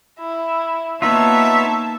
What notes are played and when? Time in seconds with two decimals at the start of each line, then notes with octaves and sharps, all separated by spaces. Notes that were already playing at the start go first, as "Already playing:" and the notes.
0.19 E4
1.02 A#3 B3 D#4 F4 C#5 E5 A5